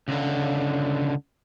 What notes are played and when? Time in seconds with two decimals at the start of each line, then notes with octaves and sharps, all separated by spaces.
0.08 C#2 D3